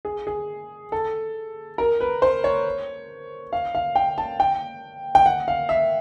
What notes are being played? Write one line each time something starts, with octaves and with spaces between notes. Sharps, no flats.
G#4
G#4
A4
A#4
B4
C5
C#5
F5
F5
G5
A5
G5
G5
F#5
F5
E5